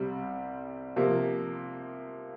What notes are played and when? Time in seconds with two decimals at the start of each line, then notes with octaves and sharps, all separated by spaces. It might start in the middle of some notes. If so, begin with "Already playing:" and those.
Already playing: C2 C3 G3
0.96 C3 F3 A#3